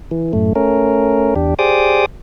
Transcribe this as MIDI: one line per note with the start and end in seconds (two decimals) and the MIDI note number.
0.11 0.32 52
0.33 0.53 42
0.33 0.53 45
0.33 0.53 57
0.55 1.34 57
0.55 1.34 61
0.55 1.34 70
1.36 1.54 40
1.36 1.54 62
1.36 1.54 67
1.59 2.06 67
1.59 2.06 68
1.59 2.06 72
1.59 2.06 74
1.59 2.06 86
1.59 2.06 87